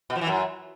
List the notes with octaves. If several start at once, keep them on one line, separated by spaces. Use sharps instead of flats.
B2
F3
E3
F#2